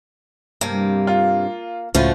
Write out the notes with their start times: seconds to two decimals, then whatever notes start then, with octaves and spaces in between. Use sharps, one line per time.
0.61 G2 C3 A#3
1.07 F4
1.95 C#2 A2 C#3 F3 A3 F#4 B4 F5